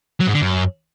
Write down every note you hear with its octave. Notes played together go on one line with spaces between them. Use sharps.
F#3
G#2
D3
F#2